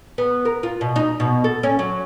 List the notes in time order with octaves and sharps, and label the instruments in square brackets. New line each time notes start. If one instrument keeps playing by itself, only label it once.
[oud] B3
A#4
F4
B2
D#4
B2
A4
C#4
F#3